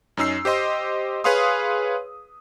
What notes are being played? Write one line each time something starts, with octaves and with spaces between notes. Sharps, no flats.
F#2 C#4 D#4 E6 C7
G4 C5 D#5 C6
G#4 B4 C#5 F5 C6 D#6